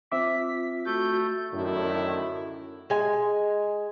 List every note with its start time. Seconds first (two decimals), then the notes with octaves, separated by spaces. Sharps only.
0.12 C4 F4 E5 D6 B6
0.85 A3 F#4 G6
1.52 F#2 A2 D3 D#3 E4
2.90 G#3 G#5